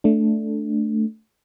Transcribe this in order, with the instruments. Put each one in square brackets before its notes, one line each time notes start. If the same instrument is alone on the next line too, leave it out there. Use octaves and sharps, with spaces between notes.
[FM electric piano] A3 D4